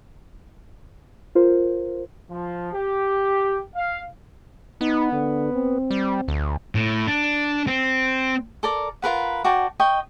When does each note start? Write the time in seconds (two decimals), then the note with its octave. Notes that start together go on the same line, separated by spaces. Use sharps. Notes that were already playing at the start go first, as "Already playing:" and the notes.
1.35 F4 A#4 C5
2.31 F3
2.73 G4
3.75 F5
4.81 B3 D#4
5.12 D3
5.53 C4
5.90 G3
6.28 D2
6.75 A2
7.07 D4
7.67 C4
8.63 A4 A#4 D5
9.02 F4 A#4 B4 F#5
9.44 F#4 D5 G5 A5
9.80 D#5 G5 C#6